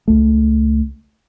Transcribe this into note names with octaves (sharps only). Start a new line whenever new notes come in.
C#2 A3